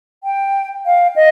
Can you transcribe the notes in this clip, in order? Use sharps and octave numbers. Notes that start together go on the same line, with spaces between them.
G5
F5
D#5